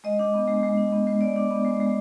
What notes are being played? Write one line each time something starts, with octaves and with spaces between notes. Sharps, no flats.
G#3 D#5
D4
B3
G#3
G#3
D4
B3
G#3
G#3 D5
D4
B3
G#3
G#3